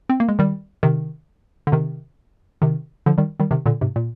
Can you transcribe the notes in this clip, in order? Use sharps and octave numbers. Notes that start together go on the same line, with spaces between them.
C4
A#3
G#3
D#3 G3
C3 D#3
D3
C3 D#3
C3 D#3
D3 F3
D#3 G3
D#3 G3
C3 D#3
A#2 D3
G#2 C3
A#2